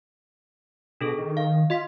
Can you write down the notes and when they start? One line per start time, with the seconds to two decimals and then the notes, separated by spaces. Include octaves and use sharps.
1.01 B2 D4 G#4 A4
1.18 D#3
1.37 F5
1.70 F4 D#5 C6 B6